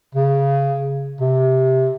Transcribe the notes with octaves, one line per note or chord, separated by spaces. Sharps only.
C#3
C3